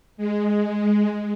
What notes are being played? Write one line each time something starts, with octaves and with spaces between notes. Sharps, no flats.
G#3